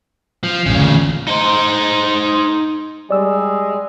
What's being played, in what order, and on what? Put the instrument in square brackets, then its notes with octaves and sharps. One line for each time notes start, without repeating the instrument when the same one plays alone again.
[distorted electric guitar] F3
[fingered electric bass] A1 G2 [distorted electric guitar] A#2 C#3
[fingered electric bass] D3 E3 A3
[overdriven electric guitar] D#4 C5
[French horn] G3 [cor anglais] G#3 [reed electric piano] D5 E6